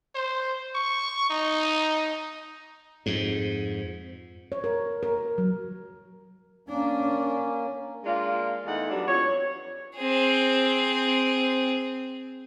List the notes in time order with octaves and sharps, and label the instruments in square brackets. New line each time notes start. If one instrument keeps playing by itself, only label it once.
[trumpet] C5
C#6
D#4
[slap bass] F2 G#2
[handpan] C#5
A#4
A#4
F#3
[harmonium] A#3 C#4 [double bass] D4
[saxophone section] G#3 A#3 D4 F4
E2 A3 D#4 F#5
F#3 G3 B3 D4
F2 C#5
[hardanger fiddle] C4 G#4